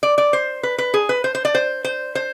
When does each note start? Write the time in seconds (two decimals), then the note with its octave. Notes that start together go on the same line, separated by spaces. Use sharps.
0.03 D5
0.18 D5
0.33 C5
0.63 B4
0.78 B4
0.94 G#4
1.09 B4
1.24 C5
1.35 C5
1.45 D5
1.55 C5
1.84 C5
2.15 C5